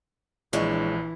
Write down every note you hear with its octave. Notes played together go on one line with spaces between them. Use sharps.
A#1 E3 G#3 D4 C#5